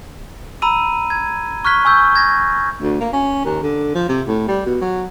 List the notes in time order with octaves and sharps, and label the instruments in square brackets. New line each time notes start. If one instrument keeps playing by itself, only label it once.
[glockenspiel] A#5 B5 E6 D#7
G#6
C#6 F6 F#6 G#6 B6 G7
G#5 C#6 E6 G6
G#6 A#6
[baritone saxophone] D2
A#3
C#4
D#2
D3
F3
C3
A2
G3
B2
F#3